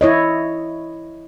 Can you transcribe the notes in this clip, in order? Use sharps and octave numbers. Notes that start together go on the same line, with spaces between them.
E4 C#5 D#5